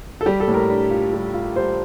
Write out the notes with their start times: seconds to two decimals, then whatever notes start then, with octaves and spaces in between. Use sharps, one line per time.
0.21 A4
0.26 G3 G4
0.40 A4
0.48 A2
0.54 A#4
0.69 D4
0.91 F4
1.13 G3
1.34 F4
1.56 G3 C5